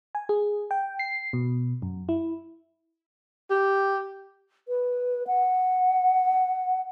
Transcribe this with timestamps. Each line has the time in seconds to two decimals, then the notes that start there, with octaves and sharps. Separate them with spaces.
0.15 G#5
0.29 G#4
0.71 G5
0.99 C7
1.33 B2
1.82 F#2
2.09 E4
3.50 G4
4.68 B4
5.27 F#5